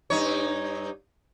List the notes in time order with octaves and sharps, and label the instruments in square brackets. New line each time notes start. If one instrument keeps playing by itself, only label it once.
[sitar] G2 D#4 C#5